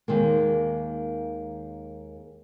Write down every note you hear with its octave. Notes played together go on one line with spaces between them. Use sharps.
D#2 D#3 G#3 A#3